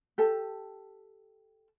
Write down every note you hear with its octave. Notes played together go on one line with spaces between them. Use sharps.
G4 A4 A5